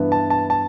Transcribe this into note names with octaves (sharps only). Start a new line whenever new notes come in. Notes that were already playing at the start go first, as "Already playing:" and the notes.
Already playing: G2 E3 B3
A5
A5
A5